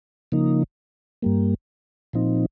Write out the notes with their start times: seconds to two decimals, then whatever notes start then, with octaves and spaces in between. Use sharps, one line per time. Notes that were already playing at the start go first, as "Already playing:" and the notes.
0.32 C#3 F3 A#3 D#4
1.22 G2 G3 A#3
2.13 A#2 F3 C4 D#4